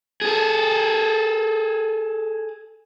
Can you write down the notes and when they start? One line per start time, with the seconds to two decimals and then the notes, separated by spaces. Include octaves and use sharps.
0.22 G#4 A4